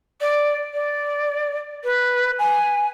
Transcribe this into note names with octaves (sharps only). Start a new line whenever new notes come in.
D5
D5
B4
G#5